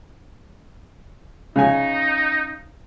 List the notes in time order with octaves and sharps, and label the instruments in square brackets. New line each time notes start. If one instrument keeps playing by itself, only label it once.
[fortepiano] C#3 G#5 [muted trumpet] D#4